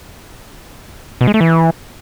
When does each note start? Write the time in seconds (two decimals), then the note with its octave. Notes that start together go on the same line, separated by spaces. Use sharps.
1.21 B2
1.27 G#3
1.34 A3
1.41 E3